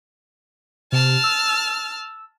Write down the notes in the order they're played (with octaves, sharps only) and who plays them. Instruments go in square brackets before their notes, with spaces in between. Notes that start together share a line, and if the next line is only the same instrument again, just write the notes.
[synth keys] C3 [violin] A5 F6
[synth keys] E6